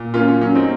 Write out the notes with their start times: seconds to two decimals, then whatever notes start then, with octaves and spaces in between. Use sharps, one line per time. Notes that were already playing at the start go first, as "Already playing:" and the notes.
Already playing: A#2
0.14 A#3 C#4 F4
0.28 C#4 F4
0.41 F#3 C#4
0.55 C4 D#4